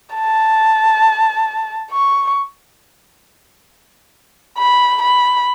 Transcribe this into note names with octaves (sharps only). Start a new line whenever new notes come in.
A5
C#6
B5
B5